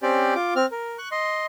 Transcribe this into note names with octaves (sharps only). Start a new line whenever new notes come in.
C4 C#4 G4 C5 D5
F4 D6
C4 F6
A#4
C#6 F#6
D#5 C6